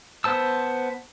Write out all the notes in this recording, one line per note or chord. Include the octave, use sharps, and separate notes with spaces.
B3 C5 A5 E6